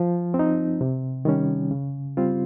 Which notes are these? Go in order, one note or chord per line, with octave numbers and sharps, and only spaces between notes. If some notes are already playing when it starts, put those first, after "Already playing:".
Already playing: F3
C4
D#4
C3
D#3 G3 C#4
C#3
G3 C4 F4